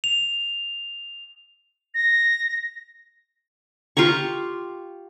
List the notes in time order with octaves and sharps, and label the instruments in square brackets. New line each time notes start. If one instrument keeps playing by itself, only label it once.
[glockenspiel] F7
[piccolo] A#6
[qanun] F4 G4 A#5 C#6